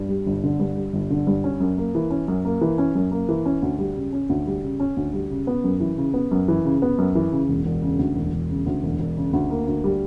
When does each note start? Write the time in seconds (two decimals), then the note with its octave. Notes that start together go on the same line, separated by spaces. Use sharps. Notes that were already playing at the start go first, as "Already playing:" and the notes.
Already playing: G2
0.09 G3
0.26 G1
0.43 D3
0.60 G2
0.77 G3
0.93 G1
1.10 D3
1.27 G2
1.44 C#4
1.60 F#2
1.77 A#3
1.95 E3
2.10 C#4
2.28 F#2
2.45 A#3
2.61 E3
2.78 C#4
2.95 F#2
3.11 A#3
3.29 E3
3.45 C#4
3.62 D2
3.79 G3
3.96 C#3
4.13 C#4
4.29 D2
4.47 G3
4.63 C#3
4.80 C#4
4.97 D2
5.13 G3
5.30 C#3
5.47 B3
5.64 F#2
5.80 E3
5.97 C#3
6.14 B3
6.31 F#2
6.48 E3
6.65 C#3
6.82 B3
6.98 F#2
7.15 E3
7.32 C#3
7.49 E1
7.65 E1
7.82 C#3
7.99 D2
8.16 E1
8.33 E1
8.50 C#3
8.66 D2
8.83 E1
9.00 E1
9.17 C#3
9.33 D2
9.50 A#3
9.67 D2
9.84 G3